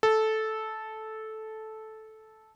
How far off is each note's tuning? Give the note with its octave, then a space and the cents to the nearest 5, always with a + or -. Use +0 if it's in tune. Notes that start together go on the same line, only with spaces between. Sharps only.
A4 -10